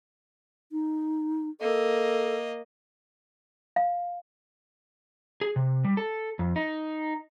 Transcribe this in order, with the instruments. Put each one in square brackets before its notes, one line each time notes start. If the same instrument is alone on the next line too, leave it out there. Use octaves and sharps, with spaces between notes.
[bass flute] D#4
[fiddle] A#3 D#5 [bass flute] A4
[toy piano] F5
[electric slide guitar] G#4
C3
G3
A4
F2
D#4